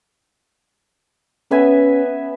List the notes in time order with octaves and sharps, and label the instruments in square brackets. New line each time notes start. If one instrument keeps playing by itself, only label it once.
[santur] B3 E5 G#5 [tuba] C#4